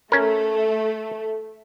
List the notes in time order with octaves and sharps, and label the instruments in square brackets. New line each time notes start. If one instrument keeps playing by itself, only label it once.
[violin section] A3 [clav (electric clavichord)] C#4 A#4